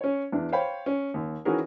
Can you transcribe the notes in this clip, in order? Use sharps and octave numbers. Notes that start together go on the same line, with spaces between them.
C#4 C#5
E2 D4
C5 C#5 F5 G5 B5
C#4
D#2
D#3 E3 C#4 F#4 G#4 A#4